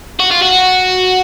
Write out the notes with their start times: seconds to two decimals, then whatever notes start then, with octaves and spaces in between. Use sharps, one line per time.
0.20 F#4
0.31 F4
0.42 F#4